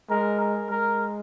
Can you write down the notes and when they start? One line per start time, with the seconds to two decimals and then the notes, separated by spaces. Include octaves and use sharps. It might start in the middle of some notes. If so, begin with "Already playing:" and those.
0.10 G#3 A#4
0.41 A#4
0.71 G#3 A#4